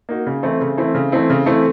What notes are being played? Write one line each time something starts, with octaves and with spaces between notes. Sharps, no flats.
A#3 D#4 F#4
C#3
E3 A3 C4 E4
C#3
E3 A3 C4 E4
C#3
E3 A3 C4 E4
C#3
E3 A3 C4 E4